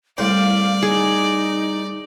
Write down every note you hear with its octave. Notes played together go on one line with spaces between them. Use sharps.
C2 A2 C5 D5 F5
D#4 G#4